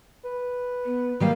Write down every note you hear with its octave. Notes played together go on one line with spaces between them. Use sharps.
B4
B3
D#3 G3 A#3 F5